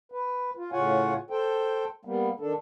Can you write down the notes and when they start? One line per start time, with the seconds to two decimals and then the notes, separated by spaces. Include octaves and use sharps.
0.12 B4
0.57 F4
0.72 A2 C#3 F4 C#5 F#5 G#5
1.30 A4 C5 G5
2.05 G3 A#3 B3
2.40 D#3 D4 A4